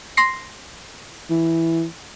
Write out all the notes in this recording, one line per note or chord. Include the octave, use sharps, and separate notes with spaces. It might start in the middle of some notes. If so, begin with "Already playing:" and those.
C6 A#6 C7
E3